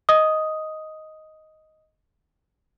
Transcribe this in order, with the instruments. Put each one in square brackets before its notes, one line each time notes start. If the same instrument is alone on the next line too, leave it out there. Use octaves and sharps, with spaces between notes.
[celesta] D#5 D#6